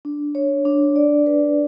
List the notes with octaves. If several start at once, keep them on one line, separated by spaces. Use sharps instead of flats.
D4
C#5
D4
D5
B4